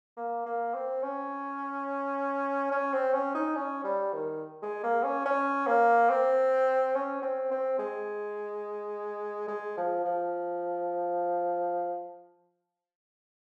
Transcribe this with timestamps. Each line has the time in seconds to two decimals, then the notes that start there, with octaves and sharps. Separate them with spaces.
0.17 A#3
0.46 A#3
0.74 C4
1.03 C#4
2.71 C#4
2.93 C4
3.14 C#4
3.35 D#4
3.55 C#4
3.84 G3
4.13 D#3
4.62 G#3
4.84 A#3
5.03 C#4
5.25 C#4
5.67 A#3
6.10 C4
6.95 C#4
7.22 C4
7.51 C4
7.79 G#3
9.48 G#3
9.77 F3
10.04 F3